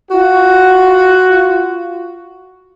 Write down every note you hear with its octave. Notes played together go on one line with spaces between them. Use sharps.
F4 F#4